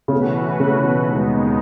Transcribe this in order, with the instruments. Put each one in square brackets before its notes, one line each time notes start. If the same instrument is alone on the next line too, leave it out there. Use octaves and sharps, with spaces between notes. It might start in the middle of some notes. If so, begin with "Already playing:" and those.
[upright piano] C#3
[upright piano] B2 [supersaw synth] E3 A3 C#4 F#4 B4
[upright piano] C#3
B2
[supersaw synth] D#2 D#3 G#3 B3 D#4